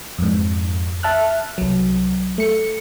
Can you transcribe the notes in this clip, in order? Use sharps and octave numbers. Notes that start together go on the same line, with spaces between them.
F2 G#2
E5 A5 F6 F#6
C2 F#3
A3 C#7